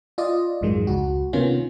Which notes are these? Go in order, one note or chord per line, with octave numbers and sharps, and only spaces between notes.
F4 D5 D#5
A#1 F2 G#2 D#3 F#3 G#3
C#2 F#4
C3 D#3 A#3 B3 C#4 F4